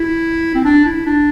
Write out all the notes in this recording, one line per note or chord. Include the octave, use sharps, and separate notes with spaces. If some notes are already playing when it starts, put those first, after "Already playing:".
Already playing: E4
C4
D4
E4
D4